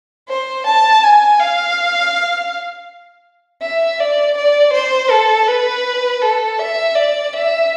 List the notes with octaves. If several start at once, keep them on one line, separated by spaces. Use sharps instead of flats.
C5
A5
G#5
F5
E5
D5
D5
C5
A4
B4
A4
E5
D5
E5